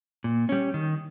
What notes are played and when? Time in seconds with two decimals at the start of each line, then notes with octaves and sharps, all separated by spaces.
0.24 A#2
0.49 G3 C#4
0.74 D#3